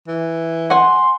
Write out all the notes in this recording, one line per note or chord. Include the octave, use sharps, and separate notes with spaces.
E3
F#5 G#5 C6